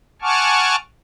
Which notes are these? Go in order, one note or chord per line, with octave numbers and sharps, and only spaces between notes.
F#5 G#5 A5 C#6 D6 F6